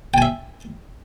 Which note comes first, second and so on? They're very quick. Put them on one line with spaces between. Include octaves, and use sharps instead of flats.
G5 G#5 E5